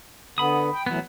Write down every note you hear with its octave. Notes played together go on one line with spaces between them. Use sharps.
D3 B3 B5 D#6
G5
A2 E3 F#3 B3